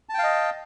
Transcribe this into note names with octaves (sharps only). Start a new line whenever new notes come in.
D#5 F5 G5 A5